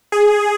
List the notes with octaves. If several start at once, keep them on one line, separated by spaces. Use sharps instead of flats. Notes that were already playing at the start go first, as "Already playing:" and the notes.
G#4